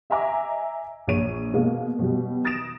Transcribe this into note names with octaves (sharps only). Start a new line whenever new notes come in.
D#5 E5 G#5 A#5 D6
A#1 C#5 D#7
B2 G#3 A#3
B2 F#3 G3
D#6 A6 A#6 D7 E7